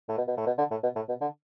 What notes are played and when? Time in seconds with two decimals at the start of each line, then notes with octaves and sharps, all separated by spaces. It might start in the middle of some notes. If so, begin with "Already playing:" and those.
0.09 A2
0.17 B2
0.27 B2
0.37 A2
0.46 B2
0.58 D3
0.71 A2
0.83 B2
0.95 A2
1.09 B2
1.21 D3